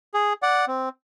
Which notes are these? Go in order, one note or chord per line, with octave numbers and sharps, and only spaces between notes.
G#4
D5 F#5
C4